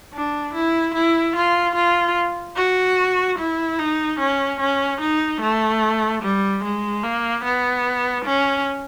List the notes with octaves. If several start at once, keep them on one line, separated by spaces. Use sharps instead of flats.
D4
E4
E4
F4
F4
F#4
E4
D#4
C#4
C#4
D#4
A3
G3
G#3
A#3
B3
C#4